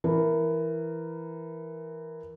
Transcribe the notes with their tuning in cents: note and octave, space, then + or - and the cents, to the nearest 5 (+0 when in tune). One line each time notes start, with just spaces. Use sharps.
E3 +5 A#4 +0